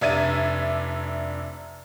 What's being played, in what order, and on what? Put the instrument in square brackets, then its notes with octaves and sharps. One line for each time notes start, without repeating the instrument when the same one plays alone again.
[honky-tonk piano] F1 D4 E5 G#6 A6 D#7